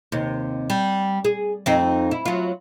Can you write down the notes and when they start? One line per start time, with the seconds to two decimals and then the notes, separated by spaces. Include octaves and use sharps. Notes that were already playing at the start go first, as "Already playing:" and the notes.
0.12 D#2 C3
0.70 G3
1.25 G#4
1.66 F2 C4 D#4
2.11 E4
2.25 F#3 F4